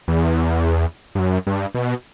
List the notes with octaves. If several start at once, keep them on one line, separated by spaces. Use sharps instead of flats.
E2
G2
F#2
G2
B2